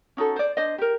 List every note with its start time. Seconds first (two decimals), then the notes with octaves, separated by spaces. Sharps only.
0.17 C#4 D#4 F#4 A4
0.36 C5 D5
0.57 D4 C5 D#5
0.78 G4 A#4